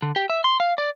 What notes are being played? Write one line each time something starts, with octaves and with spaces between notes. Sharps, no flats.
D3
G4
E5
C6
F5
D5